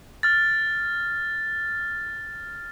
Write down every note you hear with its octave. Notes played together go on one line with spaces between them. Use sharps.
F6 A6